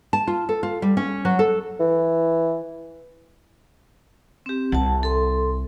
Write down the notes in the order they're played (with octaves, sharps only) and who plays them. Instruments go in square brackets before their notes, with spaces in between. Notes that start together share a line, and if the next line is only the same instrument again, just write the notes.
[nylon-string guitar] A5
F4
A4
F4
G3
C#4
F#3
A4
[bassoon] E3
[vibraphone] C4 G4
[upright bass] C2 [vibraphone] F#5 A5
[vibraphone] A4 C6